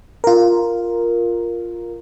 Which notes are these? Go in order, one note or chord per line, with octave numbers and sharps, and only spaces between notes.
F4 A#4